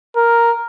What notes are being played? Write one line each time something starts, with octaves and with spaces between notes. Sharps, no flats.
A#4